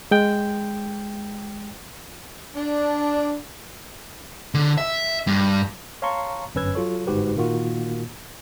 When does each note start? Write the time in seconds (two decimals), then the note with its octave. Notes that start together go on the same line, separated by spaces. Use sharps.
0.11 G#3 G5
2.55 D4
4.54 D3
4.78 E5
5.27 G2
6.02 C#5 F5 A5 A#5 C6 C#6
6.55 G1 F#2 C#4 B4 E6 G#6
6.75 F#3 F4 A4 C#5
7.07 G1 G#2 F#4 G4 B4
7.36 A#2 D#3 A#3 F4 F#4